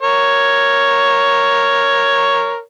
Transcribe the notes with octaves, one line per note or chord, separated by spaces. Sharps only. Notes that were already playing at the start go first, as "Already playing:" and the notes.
A#4 C#5